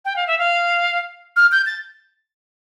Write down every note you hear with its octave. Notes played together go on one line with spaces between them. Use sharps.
G5
F5
E5
F5
F6
G6
A6